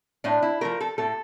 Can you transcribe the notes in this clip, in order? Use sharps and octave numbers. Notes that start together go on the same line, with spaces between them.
A2 D4
E4
F3 A3 A#4
A4
A2 A4